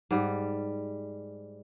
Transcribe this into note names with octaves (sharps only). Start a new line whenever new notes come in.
G#2 G3